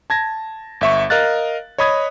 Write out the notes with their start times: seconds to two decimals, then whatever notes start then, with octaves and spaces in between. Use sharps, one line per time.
0.10 A5 G#6 A#6
0.81 G1 E5 C#6
1.10 A#4 D#5 F5 F#6 A6
1.78 C#5 D#5 B5 D#6 G#6